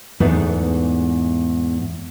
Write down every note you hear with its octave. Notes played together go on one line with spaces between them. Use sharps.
E2 G#2 A3 B3 D#4